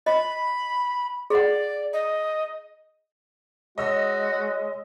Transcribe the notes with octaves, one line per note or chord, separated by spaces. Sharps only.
D#5 B5
G#4 D5 F#5
D#5
G#3 F#4 C#5 D#5 E6